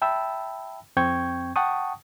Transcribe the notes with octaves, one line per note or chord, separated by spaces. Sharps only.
E5 G5 A5 B5 E6
F2 C4 G5 C#6 G6 G#6
F#5 G5 A5 C#6 D#6